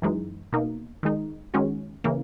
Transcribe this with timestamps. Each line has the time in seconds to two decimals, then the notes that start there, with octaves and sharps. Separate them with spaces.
0.02 F#2 E3 G#3 D#4
0.53 B2 A#3 D#4
1.03 D#3 G#3 D#4
1.54 D#3 G#3 C#4 F#4
2.04 C#3 E3 A#3